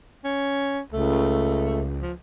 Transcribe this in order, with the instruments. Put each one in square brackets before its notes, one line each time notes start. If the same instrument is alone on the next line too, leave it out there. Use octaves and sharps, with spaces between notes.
[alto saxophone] C#4
[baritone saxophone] C#2 [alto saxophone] A3
[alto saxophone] F3